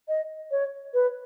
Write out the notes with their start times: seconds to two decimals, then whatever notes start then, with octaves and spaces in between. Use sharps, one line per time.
0.08 D#5
0.51 C#5
0.94 B4